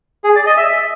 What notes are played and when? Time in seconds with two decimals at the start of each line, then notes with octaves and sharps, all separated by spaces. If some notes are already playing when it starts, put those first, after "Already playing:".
0.24 G#4
0.36 D5
0.47 D#5
0.57 E5